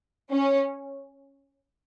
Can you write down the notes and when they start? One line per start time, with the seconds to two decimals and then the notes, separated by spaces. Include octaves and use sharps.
0.32 C#4